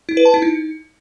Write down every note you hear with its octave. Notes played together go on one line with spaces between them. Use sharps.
E4
B4
A5
E4
D#4